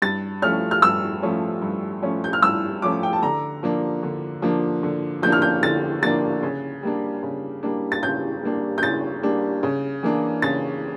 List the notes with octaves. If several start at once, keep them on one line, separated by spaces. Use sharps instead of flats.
G2 A6
F3 A3 C#4 F6
F6
G2 E6
F3 A3 C#4
G2
F3 A3 C#4
G6
F6
G2 E6
F3 A3 C#4 D6
G5
A5
D3 A#5
F3 A#3 D4
D3
F3 A#3 D4
D3
F3 A#3 D4 G6
F6
G6
D3 A6
F3 A#3 D4 A6
C#3
G3 A#3 D4
C#3
G3 A#3 D4
A6
C#3 G6
G3 A#3 D4
G6
C#3 A6
G3 A#3 D4
C#3
E3 A#3 D4
C#3 A6